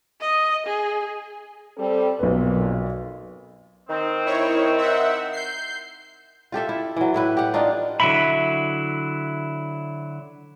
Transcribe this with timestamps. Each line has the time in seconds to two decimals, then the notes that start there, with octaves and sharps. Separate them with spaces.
0.21 D#5
0.66 G#4
1.77 G3 C4 A4
2.19 B1 F2 A#2 B4
3.90 D#3 C4
4.26 E4 C#5
4.78 E5 F#5
5.33 G6 C7
6.52 F4 G4 A4 E5
6.69 E4
6.97 E3 F#3
7.14 A2 E4 B4
7.37 G4 F#5
7.54 D4 D#4 F4
8.00 D3 F#3 E4 E5 B5